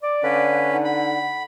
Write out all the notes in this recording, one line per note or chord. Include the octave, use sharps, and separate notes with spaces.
D5 D6
D3 C#4 B4 F5
D#4 F#5
B5